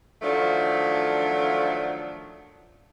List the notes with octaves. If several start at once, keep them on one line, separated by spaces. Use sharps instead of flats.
D#3 F3 F#3 A3 D4